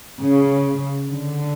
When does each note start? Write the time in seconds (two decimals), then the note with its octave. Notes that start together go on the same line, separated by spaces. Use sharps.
0.20 C#3
1.08 D3